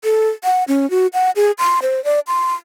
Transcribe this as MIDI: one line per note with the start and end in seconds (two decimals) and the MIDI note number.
0.04 0.29 69
0.44 0.64 78
0.68 0.89 61
0.91 1.07 66
1.13 1.31 78
1.36 1.51 68
1.58 1.79 84
1.82 2.03 72
2.05 2.20 74
2.27 2.53 84